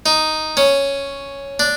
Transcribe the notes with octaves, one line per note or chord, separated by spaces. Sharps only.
D#4
C#4
D4